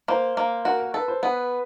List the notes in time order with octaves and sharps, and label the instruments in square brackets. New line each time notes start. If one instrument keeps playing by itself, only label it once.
[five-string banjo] A#3 [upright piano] C5
[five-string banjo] A#3
[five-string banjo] F#4 [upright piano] A#4
[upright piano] A#4
[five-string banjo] A4 [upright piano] B4
[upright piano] C5
[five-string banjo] B3 [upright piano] B4